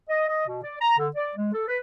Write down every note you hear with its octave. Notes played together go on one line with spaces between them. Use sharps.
D#5
D#5
B2
D5
A#5
D3
D5
G#3
A4
B4